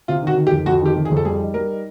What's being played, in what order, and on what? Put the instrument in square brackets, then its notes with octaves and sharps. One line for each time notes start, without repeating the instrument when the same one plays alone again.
[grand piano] C3 [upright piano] F4
[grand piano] D#3 [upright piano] F#4
[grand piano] D#3
[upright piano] G4
[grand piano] F2
[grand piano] F2 [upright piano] F#4
[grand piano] D#3 [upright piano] G4
[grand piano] C3
[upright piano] G#4
[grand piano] F2
[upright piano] A4
[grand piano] G3 [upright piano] G#4
[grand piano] D#4
[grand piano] G3 [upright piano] A#4
[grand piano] D#4